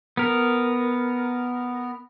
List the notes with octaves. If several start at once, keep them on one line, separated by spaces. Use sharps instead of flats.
B3 A#4